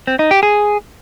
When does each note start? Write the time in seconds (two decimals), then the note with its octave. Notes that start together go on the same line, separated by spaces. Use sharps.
0.07 C4
0.19 D#4
0.31 G4
0.43 G#4